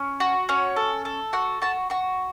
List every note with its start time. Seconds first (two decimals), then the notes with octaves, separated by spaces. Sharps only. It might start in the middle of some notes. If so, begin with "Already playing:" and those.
Already playing: C#4
0.20 F#4
0.49 C#4 C#5
0.76 A4
1.05 A4
1.33 F#4 F#5
1.62 F#4 A5
1.90 F#4 C#6